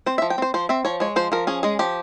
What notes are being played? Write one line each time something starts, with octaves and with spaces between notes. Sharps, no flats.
C4 C5
E5
F3
G5
C4 C5
F3 C5
C4 E5
F3 C#5
G#3 C#5
F3 C5
F3 A#4
C#4 G#4
G#3 G#4
F3 G4